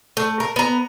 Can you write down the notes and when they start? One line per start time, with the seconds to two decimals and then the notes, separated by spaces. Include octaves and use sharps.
0.17 A3
0.40 A#4
0.56 B3 A#5